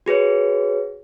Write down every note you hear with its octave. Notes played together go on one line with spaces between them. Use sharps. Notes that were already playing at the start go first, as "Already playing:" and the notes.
F#4 G#4 B4 C#5